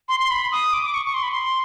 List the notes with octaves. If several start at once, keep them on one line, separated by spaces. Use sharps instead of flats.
C6
C6
B5
D#6
D6
D6
C#6
C#6
C6
B5
C6